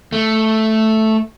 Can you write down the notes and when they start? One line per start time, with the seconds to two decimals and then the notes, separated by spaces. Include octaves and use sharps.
0.12 A3